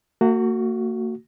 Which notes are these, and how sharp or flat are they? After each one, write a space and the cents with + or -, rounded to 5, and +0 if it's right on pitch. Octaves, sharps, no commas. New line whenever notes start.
A#3 -45 F#4 +0